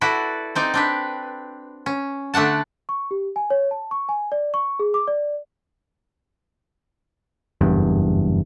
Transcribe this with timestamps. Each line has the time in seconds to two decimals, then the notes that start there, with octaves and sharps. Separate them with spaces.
0.01 E4 F#4 A4 B4 D5
0.55 C4 D#4 D5
0.74 C4 D4 B4
1.86 C#4
2.34 D3 A3 D4 F#5 A5
2.89 C#6
3.11 G4
3.36 G#5
3.50 C#5
3.71 A5
3.91 C#6
4.09 G#5
4.32 D5
4.54 C#6
4.79 G#4
4.94 D6
5.08 D5
7.61 F#1 E2 G2